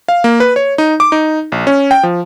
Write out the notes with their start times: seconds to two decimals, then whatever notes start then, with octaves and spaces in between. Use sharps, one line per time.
0.08 F5
0.24 A#3
0.40 B4
0.56 C#5
0.78 D#4
1.00 D6
1.12 D#4
1.52 A#1
1.67 C#4
1.91 G5
2.03 F3